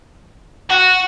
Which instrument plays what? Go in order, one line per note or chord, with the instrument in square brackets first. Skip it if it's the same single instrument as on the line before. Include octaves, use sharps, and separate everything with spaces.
[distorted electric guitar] F#4 [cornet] F#5